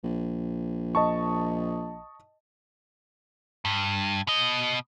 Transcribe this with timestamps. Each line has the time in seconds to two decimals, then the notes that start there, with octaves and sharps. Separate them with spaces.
0.04 A#1
0.95 D#5 A5 C#6
3.65 G2
4.27 B2 D#5